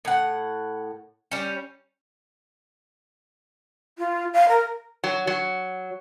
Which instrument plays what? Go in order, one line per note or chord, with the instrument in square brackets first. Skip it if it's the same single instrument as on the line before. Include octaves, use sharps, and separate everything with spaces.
[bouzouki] A2 F#5
G3 C#4
[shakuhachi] F4
F5
A#4
[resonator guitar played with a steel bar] F#3
F#3